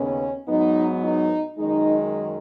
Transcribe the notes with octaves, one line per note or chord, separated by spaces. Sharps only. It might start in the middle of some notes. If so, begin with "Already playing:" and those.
Already playing: D#2 C#3 B3 C#4
G#2 F#3 B3 D#4
D#4
F#2 D#3 G#3 D#4